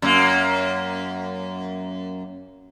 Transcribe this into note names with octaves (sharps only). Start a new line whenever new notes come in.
F#2 A#3